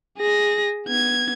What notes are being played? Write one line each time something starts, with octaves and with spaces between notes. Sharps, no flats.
G#4 A#6
B3 G#6